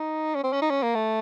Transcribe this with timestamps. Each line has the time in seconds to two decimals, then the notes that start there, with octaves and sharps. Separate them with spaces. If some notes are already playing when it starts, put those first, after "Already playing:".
Already playing: D#4
0.35 C#4
0.44 C4
0.53 C#4
0.62 D#4
0.70 C#4
0.83 A#3
0.95 A3